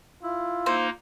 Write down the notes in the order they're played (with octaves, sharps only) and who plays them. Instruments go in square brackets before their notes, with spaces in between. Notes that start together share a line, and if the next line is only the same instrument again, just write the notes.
[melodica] E4 [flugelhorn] F4
[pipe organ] A#3 D#4 [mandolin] C5